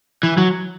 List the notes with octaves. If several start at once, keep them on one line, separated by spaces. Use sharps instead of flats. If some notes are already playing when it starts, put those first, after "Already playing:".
E3
F#3